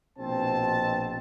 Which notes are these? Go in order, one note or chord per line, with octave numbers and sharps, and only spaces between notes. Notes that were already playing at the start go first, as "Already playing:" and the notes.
A#1 B2 C4 A5